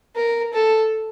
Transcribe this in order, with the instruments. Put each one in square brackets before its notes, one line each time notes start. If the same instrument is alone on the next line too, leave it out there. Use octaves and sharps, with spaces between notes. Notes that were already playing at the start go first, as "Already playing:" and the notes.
[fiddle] A#4
A4